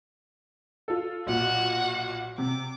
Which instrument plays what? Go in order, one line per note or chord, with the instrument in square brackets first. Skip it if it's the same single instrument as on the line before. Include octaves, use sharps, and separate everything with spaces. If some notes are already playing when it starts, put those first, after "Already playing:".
[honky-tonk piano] F4 A4
[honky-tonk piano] B1 A#2 [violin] F#4 F#5
[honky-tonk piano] C3 [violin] D6